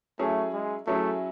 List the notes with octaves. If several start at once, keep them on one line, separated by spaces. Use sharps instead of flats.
F#3 A3 C#4 E4 G#4
G#3
F#3 A3 C#4 E4 G#4